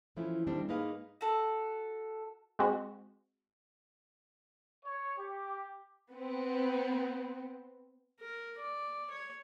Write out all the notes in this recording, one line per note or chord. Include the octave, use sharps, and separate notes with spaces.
E3 F3 A3 C#4 E4
D#3 G3 C4 D4
G#2 A#3 D#4 G#4 B4 F5
F#4 A4
G#3 C4 F#4
C#5
G4
B3 C4
A#4
D5
C#5